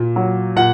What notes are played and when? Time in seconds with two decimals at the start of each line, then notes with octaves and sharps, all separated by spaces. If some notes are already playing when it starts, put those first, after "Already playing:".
Already playing: A#2
0.16 F#3
0.56 A#2 F#5